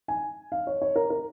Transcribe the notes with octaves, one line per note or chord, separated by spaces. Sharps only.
G#5
F5
C#5
C#5
A#4
A#4